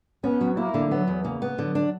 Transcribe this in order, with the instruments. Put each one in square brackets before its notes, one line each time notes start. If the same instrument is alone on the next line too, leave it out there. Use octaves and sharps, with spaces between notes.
[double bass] B3 [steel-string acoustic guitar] C#4
[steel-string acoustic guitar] F#3
[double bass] A#3 [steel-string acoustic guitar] E4
[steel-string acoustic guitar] D3
[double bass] F#3 [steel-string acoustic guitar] B3
[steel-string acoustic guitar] E2
[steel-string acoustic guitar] C#3 [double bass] A#3
[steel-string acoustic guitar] B3
[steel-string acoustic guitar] D3 [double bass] F#3
[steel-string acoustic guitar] D4